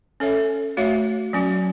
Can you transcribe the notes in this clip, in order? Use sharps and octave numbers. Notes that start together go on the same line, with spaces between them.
C#4 A4 C#5 E5
A3 F#4 C#5 E5
F#3 C#4 F#4